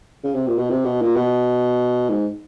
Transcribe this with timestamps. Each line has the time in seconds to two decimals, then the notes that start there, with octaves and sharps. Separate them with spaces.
0.24 C#3
0.35 C3
0.48 A#2
0.58 B2
0.70 C3
0.85 B2
1.02 A#2
1.16 B2
2.10 G#2